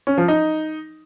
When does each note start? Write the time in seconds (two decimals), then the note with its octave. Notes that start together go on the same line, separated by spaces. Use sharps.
0.07 C#4
0.18 F3
0.28 D#4